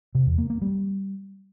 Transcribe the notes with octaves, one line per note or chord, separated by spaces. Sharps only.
C3
E2
A#3
A#3
G3